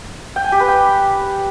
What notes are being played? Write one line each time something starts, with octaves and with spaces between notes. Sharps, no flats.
G5
G#5
G4
B4
G5